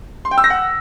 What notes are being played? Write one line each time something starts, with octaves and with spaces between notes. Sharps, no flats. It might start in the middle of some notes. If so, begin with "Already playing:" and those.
C6
G5
E6
A#6
F#5